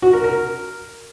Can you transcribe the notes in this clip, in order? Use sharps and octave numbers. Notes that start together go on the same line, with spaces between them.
F#4
A#4
A#4